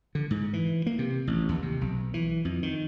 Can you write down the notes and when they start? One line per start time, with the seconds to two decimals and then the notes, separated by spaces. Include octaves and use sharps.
0.15 D3
0.31 G#2
0.53 E3
0.86 A#3
0.99 C3
1.27 A1
1.49 D#2
1.62 C3
1.81 B1
2.14 E3
2.45 F2
2.63 D#3